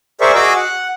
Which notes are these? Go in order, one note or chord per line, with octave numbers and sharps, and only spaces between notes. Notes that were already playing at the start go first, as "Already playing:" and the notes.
G#4 A#4 C5 D5 E5 C#6
F#4 G#4 D#5 D6 E6
F#5